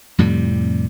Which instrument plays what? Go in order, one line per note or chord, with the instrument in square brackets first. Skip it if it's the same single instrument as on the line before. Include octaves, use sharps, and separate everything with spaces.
[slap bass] F2 A2 C3 G3